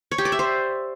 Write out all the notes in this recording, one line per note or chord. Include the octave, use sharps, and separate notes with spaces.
C#5
G4
D5
E5
C5